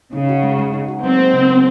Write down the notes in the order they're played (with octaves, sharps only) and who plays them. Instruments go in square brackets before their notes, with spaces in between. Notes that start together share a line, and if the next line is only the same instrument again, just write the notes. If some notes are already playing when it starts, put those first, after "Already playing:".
[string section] C#3 [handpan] D#4
[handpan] F#4
G#3
G#3
D#4
F#4
[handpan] F#3 [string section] C4
[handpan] A#3
C#3
C#4